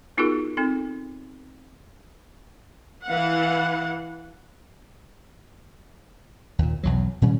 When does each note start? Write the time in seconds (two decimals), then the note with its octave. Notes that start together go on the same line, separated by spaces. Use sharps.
0.17 B3 D#4 F4 F#4 G#4 A#4
0.57 C4 D#4 A4
3.07 E3 F5 F#5
6.59 D#2 A#2
6.83 B1 E2 F#3
7.22 A#2 D#3 G3 C#4